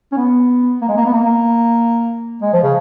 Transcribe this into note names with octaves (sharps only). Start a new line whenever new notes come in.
C#4
B3
A#3
G#3
A#3
B3
A#3
G#3
F3
C#3